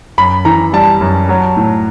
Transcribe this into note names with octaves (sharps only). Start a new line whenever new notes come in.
F#2 B5
E3 A#5
G3 A5
F#2
F#3
A2